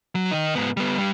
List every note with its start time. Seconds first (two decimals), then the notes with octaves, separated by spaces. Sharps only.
0.15 F#3
0.31 D#3 D#4
0.55 G#2 B3
0.77 G3 B3
0.98 G2 G3